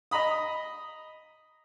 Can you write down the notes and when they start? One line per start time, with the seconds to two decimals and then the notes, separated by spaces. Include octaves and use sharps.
0.11 D#5 A#5 B5 D#6